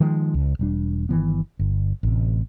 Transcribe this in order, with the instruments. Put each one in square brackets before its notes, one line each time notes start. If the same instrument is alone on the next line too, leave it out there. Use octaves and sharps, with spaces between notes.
[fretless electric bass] D#3 F3 G#3
C#2
E1 G3 D4
G1 D#3 E3 B3
G1
A1 C3